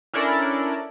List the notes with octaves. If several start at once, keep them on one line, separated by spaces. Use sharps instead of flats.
C#4 D4 E4 A4 A#4 D5